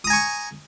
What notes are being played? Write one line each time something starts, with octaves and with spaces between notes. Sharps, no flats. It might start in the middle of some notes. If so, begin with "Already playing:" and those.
G#5 A#5 C#6 D#6